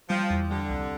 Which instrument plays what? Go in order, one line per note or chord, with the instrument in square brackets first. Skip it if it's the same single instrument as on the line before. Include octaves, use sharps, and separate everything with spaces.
[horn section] F3 [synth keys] G3
[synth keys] E2
[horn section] D3 [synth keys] G3
[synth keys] C2